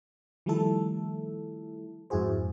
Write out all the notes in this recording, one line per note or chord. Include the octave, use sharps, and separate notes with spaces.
D#3 F3 G3 A3 E4 A4
F2 G#2 E4 F#4 G#4 C5